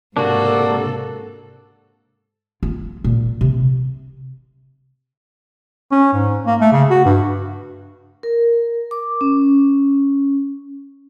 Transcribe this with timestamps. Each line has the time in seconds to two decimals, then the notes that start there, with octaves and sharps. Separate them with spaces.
0.17 G#2 C3 A#3 D4 F#4 A4
2.63 F4
3.04 A#2
3.41 C3
5.92 C#4
6.13 G#2
6.46 A#3
6.61 A3
6.72 C#3
6.90 F#4
7.05 G2
8.23 A#4
8.91 D6
9.21 C#4